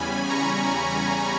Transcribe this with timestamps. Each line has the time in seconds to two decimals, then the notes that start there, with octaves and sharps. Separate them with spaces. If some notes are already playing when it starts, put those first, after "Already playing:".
Already playing: E2 C#3 G3 C#4 G#5 B5
0.29 A#5 C#6